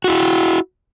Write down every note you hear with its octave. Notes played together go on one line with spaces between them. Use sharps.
E4 F#4